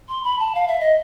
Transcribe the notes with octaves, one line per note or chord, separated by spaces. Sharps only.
C6
B5
A5
F5
E5
D#5